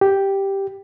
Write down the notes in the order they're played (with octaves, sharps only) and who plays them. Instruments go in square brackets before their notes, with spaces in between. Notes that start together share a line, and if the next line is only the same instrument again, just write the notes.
[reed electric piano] G4